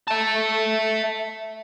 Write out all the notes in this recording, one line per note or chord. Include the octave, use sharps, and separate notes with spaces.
E5 A5